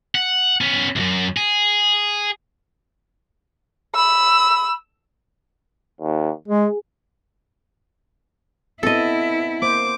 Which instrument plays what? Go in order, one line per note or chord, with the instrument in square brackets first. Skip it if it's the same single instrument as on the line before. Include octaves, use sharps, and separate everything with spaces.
[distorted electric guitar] F#5
B3 C#4
C#2 F#2
G#4
[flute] B5 [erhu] E6
[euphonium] D#2
[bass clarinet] G#3 [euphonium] G#4
[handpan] B3 C4 [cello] E4 [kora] A4 D#5
[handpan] A#3 C5 [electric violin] D6